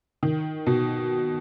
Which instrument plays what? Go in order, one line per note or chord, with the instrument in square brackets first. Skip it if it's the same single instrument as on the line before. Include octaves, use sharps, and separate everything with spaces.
[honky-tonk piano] D#3
B2